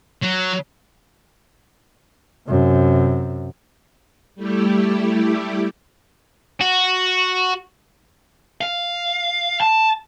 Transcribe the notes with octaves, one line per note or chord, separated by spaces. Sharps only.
F#3
F#2 C3
G3 A3 E4 G4
F#4
F5
A5